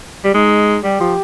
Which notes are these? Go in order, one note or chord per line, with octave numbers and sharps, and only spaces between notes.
G3
G#3 D#4
G3 G4
F3